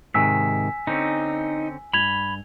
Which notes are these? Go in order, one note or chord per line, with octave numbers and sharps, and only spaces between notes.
G#2 C3 D#3 G#5 E6 B6
D3 C4 C#4 D#4
G2 B5 G#6 F7 G7